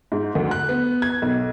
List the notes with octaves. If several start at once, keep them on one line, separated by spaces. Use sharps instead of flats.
G#2
D2
F#6
B3
G#6
B1